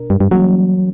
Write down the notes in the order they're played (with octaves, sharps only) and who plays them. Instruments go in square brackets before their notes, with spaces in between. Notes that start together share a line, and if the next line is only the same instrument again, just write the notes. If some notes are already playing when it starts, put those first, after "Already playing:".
Already playing: [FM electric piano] B2 D4 A#4
[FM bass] G2
G2
[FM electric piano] E3 G3 A#3 C#4 [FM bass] F#3